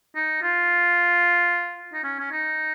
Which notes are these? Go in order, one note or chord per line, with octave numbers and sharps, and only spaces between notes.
D#4
F4
D#4
C#4
C#4
D#4